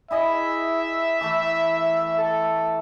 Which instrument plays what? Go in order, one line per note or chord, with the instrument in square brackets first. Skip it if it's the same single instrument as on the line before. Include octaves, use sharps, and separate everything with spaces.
[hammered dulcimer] E4 G#4 D#5 [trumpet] E5
[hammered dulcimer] E3 A3
[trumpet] A4